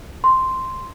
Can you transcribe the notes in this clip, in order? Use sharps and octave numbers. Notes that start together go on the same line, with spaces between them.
C6